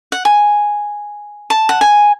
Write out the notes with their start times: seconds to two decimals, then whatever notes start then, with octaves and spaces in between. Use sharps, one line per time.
0.12 F#5
0.25 G#5
1.50 A5
1.69 F#5
1.81 G#5